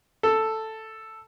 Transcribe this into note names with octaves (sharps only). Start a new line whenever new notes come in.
A4